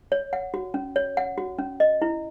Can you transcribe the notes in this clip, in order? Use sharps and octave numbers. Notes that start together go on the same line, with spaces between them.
C#5
F#5
F#4
C#4
C#5
F#5
F#4
C#4
D#5
E4